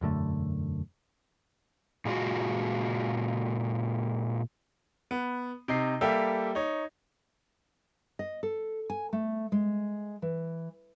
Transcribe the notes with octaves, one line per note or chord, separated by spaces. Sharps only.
E1 F#2 D3 A3
A#2 G#3 F4 F#4
B3
C3 D#4 C7
G3 A#3 G4 A4 E5
D#4 C#5
D#5
A4
G#5
A3
G#3
E3